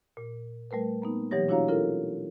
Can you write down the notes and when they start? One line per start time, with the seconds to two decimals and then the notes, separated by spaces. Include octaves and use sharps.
0.17 A#2
0.71 G3 A3 A#4 B4
1.02 A#3 B3 D#4
1.31 B2 E3 F#3 G4 C#5 A#6
1.48 D4 E4 F#4 C#5 F5 A#5
1.68 C#4 E4 F4 A4 A#4